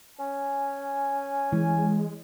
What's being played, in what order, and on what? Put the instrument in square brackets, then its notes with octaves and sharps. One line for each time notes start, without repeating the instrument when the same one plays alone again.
[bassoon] C#4 [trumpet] G#5
[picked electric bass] E3 [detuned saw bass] G#3